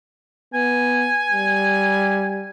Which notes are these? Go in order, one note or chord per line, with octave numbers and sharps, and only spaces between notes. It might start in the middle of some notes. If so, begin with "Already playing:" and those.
B3 G#5
G3